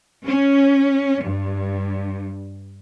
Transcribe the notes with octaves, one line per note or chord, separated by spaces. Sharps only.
C#4
G2